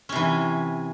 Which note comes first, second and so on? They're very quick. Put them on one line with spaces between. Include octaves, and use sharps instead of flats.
C#4 C3 E3